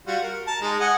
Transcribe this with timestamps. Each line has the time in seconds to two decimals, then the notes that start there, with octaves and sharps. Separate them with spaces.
0.07 G3 F4 F#4
0.22 A#4
0.47 A5 A#5
0.62 G#3 D#4
0.80 D#5 F#5 G#5